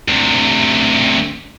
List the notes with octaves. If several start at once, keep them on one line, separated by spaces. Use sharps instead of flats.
D2 C3